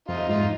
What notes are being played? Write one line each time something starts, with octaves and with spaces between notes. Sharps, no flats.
F2 D#4 F4
G#2 D#4 F4